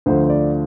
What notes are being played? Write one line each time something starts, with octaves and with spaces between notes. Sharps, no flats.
D2 D3 F3 C5
C5
D5